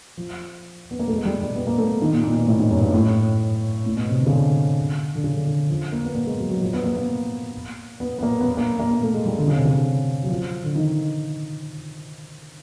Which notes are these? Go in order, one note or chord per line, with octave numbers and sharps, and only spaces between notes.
F3
B3
A#3
A3
G#3
G3
G3
B3
A#3
A3
D#3
A#2
A#2
B2
A2
G#2
F#2
G2
A2
A2
B2
C3
D3
C#3
D3
D3
C#3
D3
D3
F3
A#3
B3
A#3
G#3
F#3
F#3
F3
B3
A#3
A#3
B3
B3
A#3
B3
A#3
A#3
A#3
A#3
A3
G#3
G3
D3
C#3
C3
C#3
F#3
F3
D3
D#3